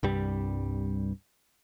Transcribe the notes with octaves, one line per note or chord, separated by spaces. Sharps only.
C2 G2 G3